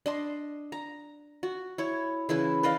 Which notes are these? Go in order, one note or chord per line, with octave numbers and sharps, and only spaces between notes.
D4 D#5 C6
A#5
F#4
E4 C#5
C#3 E3 E4 B4
B4 D5 D#5 F5